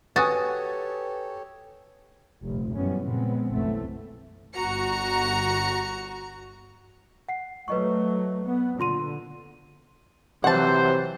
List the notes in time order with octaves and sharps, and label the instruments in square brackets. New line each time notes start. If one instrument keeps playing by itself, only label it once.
[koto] F#4 [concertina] G4 A4 C#5 [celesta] B4 [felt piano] G#5 D#6 A6
[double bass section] F1 A#1 G2 F3
F#2 E3 G3 G#3 B3 C#4
A#2 C#3 F3 G#3 B3 C4
F#1 B1 E3 A3 C4
[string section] G1 F#4 A#5 C#7
[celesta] F#5 C7
[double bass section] F#3 A3 [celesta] B4 D#5 C#6
[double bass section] B3
[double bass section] A#2 D3 [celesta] F4 C6 D#7
[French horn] C3 [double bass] E3 F#3 [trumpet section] C5 [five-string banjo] F#5 A5